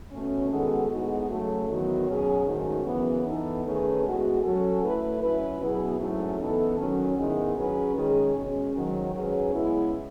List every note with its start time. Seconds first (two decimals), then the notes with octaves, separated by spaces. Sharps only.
0.11 B2 A3 C#4
0.50 D#3 G#3 B3 F#4 A4
0.89 A2 G#3 B3 D#4 F#4
1.28 C#3 F#3 A3
1.68 E2 D#3 F#3 B3 F#4
2.07 B2 F#3 C#4 G#4
2.46 G#2 D#3 A3 C#4 F#4
2.85 F#2 C#3 E3 B3
3.25 E3 B3 D#4 A4
3.64 D#3 A3 C#4 G#4 B4
4.03 A2 G#3 B3 F#4
4.43 F#3 C#4 F#4 A4
4.82 F#3 A3 E4 B4
5.21 F#3 C#4 E4 B4
5.60 B2 F#3 B3 E4 G#4
5.99 G#2 F#3 A3 C#4 E4
6.39 E3 B3 D#4 A4
6.77 D#3 F#3 C#4
7.17 G#2 D#3 G#3 B3 E4
7.55 F#3 C#4 G#4 B4
7.95 D#3 G#3 C#4 G#4
8.35 B2 G#3 C#4
8.73 G#2 D#3 F#3
9.13 G#2 F#3 C#4 G#4 B4
9.53 C#3 G#3 B3 E4